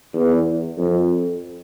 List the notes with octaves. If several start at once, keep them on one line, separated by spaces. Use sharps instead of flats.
E2
F2